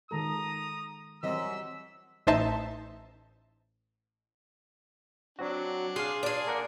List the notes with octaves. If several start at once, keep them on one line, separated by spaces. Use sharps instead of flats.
D#3 G#3 A4 A#5 D#6
F#2 E3 G3 C4 D#5 E6 B6
A1 D#4 C5 E5 A5
F#3 C4 D4 F#4
G#4 F5 C6
D4 G#4
A#3 A#4 F#5